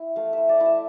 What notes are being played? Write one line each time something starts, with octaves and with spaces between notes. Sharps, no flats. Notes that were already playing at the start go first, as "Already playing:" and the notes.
Already playing: E4
A3 F5
E4 E5
D5
E4
E5